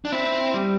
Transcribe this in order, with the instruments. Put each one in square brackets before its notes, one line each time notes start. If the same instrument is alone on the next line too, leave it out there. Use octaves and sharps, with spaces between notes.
[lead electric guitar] D4
[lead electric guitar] C4 [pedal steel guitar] E4
[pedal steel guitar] G3